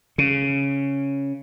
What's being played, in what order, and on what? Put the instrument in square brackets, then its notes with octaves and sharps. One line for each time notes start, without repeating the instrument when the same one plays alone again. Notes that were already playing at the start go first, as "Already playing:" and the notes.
[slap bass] C#3